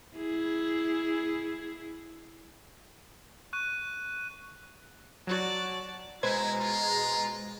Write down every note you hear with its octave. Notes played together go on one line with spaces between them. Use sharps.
E4 G#4
C#6 F#6 D#7
F#3 F#4 D5 A5
B2 G#3 E4 B4 C5 A#5 G#6
F4